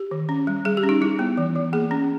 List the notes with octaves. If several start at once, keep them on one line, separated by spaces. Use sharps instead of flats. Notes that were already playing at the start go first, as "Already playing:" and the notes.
Already playing: G4
D#3
C#4
G3
G3 G#4
G4
C#4
D#4
G3 E4
B3
E3
E3
A#3 G#4
C#4